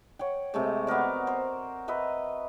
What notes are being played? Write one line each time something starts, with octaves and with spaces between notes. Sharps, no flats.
C#5 F#5 G5
C3 G#3 A3
B3 F#4 A#4 D5
C5
B4 D#5 E5 A#5